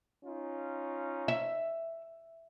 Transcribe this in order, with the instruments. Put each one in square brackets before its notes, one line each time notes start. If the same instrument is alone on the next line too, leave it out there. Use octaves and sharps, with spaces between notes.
[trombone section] C#4 D#4 F4
[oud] E5